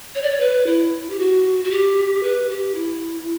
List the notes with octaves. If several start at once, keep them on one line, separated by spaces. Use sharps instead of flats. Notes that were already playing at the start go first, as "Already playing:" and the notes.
C#5
D5
C#5
B4
E4
G4
F#4
F#4
G4
B4
G4
E4